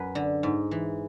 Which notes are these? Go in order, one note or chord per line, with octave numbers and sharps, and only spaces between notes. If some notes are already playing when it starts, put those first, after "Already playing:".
Already playing: F#2 B4
D3
G#2
E3